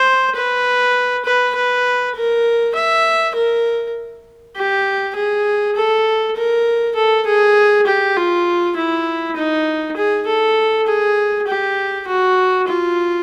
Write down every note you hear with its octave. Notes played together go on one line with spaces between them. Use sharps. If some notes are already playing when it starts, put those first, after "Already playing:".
Already playing: C5
B4
B4
B4
A#4
E5
A#4
G4
G#4
A4
A#4
A4
G#4
G4
F4
E4
D#4
G#4
A4
G#4
G4
F#4
F4